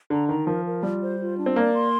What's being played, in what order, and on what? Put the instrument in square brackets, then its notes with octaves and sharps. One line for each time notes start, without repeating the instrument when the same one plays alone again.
[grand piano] D3 [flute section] A#5
[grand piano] D#3 [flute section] A#5
[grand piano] F3 [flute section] A#4
[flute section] A#4
[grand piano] G3 [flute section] F4
[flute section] C5
F4
D4
[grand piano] C4
[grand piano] A#3 [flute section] D5
[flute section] C6